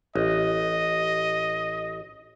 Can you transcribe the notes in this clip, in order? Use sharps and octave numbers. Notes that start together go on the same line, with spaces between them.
A1 D#5